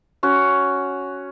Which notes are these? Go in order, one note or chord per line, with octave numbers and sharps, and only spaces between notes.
C#4 F#4